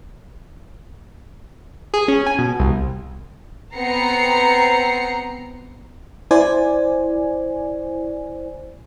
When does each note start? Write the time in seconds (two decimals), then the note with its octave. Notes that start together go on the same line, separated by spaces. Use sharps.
1.94 G#4
2.08 C#4
2.26 G#5
2.38 B2
2.59 C2
3.75 B3 C4 A#5 C7 C#7
6.31 E4 C5 D5 G#5